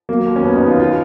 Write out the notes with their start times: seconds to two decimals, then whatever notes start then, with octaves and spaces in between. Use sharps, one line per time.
0.09 F#3 A#3
0.26 D#2
0.36 C#4
0.44 D#2 B3
0.56 D#4
0.62 D#2
0.67 F4
0.80 F4